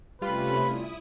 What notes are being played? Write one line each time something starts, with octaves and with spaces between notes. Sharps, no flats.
C3 G3 A3 C#4 F4 B4 B5
E4 D#6